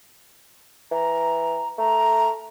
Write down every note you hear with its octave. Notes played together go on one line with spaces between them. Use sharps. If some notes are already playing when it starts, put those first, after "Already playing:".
E3 A#5
A3 A#5